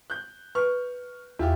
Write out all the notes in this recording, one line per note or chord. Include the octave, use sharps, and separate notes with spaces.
F#6 G6
B4 C#6 F6
E2 E4 F4 G4